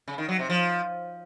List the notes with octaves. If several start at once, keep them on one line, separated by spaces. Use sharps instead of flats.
C#3
D#3
F#3
C3
F3